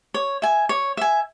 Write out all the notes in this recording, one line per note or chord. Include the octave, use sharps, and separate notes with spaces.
C#5
E5 G#5
C#5
E5 G#5